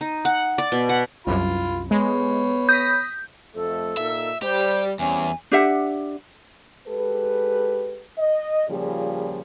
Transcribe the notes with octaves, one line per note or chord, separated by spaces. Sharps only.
D#4
F#5
D5
B2
F#5
C2 F#2 F4 B5
G#3 B3 C#5 B5
D#6 G6 A#6 B6
F2 A3 A4
A#2 A#3 D#4 E5
G3 G4 C5
E2 G3 C4 C#4 G#5
D4 G4 E5 F#5
G#3 G4 A4 B4
D#5
A#2 C#3 F3 G3 G#4